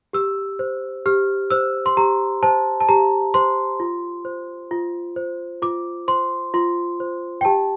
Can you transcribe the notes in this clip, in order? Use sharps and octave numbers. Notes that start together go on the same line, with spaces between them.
G4 E6
C5
G4 F6
C5 E6
C6
G4 A#5
C5 A5
A5
G4 A#5
C5 C6
F4
C5
F4
C5
F4 D6
C5 C6
F4 C6
C5
G5
G4 A5